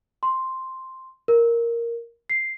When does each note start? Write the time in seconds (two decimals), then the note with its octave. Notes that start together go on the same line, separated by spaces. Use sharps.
0.23 C6
1.28 A#4
2.30 C7